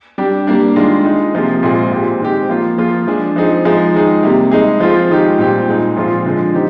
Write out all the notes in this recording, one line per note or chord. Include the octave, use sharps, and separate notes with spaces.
G3 D4 G4
G3 A#3 D4
D#3 G#3 D4 F4
G#3 D#4 G#4
C3 F3 A#3 F4 G#4
A#2 G#3 C4 F4 G#4
A#2 G#3 C4 G4
D#3 G#3 C4 G4
F3 A#3 F4
F3 A#3 F4 G#4
F3 G#3 D4 G#4
F3 C4 D#4 G#4
F3 G#3 D#4 G#4
D#3 G#3 D#4 G#4
C3 G3 A#3
G#3 D#4 G#4
F3 C4 F4 G#4
D#3 G#3 D#4 G4
A#2 G3 C4 G4
A#2 G#3 D#4
A#2 F3 G#3 C4 F4
D3 F3 G#3
D#3 C4 D#4 G4